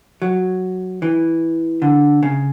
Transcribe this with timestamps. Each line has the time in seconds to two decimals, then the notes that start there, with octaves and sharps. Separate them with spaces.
0.22 F#3
1.02 E3
1.82 D3
2.23 C#3